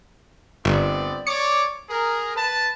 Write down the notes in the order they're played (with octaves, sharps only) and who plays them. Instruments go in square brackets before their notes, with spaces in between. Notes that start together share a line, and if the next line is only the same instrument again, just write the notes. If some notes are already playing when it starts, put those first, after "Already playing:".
[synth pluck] G1 [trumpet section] B3 C4 D5
[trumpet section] C#5 D5 D6 [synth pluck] C#7
[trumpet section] G#4 A#4
B4 A5